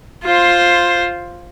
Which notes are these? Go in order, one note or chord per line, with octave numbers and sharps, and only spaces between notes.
F4 C5